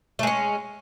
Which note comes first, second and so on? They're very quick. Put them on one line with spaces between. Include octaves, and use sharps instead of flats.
A3 G#3 C#4